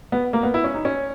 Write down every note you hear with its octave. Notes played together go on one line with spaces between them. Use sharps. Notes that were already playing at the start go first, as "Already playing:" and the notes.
B3
A#3
B3
E4
C#4
D#4
C#4